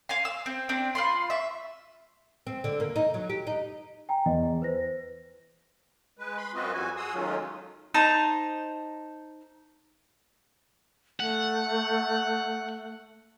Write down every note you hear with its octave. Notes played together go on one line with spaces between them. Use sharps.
F5 G#5 C6
E6
C4
C4 D4
F4 B5 C6
E5 C#6
C4
D3
A#3
D#4
F#3
G4
D#4
G5 G#5 A#5
E2 D#5
B4 C5 A#6
G#3 B4
B5 C6
F#2 C4 F4 F#4 B4 D#5
F2 G3 F#4 G#5
F#4 G#4 C6 D#6 E6
D#3 F#3 G#3 A3 C#4 F4
D#4 C5 A5 A#5
A3 F#5